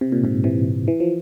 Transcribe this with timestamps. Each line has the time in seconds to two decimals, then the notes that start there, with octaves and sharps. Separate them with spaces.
0.01 C3
0.12 A#2
0.23 G#2 C3
0.44 C3 E3
0.88 E3
1.00 F3